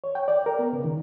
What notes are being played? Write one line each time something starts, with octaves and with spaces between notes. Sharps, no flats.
C#5
G5
D5
A#4
B3
C#3
D#3